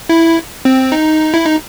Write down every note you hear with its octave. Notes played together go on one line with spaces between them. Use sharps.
E4
C4
D#4
E4
D#4